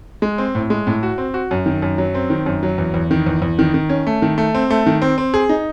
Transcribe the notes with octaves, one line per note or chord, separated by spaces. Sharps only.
G#3
C4
A2
G#3
A2
F#4
C4
F#4
F#2
D#3
F#2
F#3
C4
D#3
F#2
F#3
E2
E2
D#3
E2
E2
D#3
D#3
C#4
A3
D#3
A3
C4
A3
D#3
C4
C4
G#4
D#4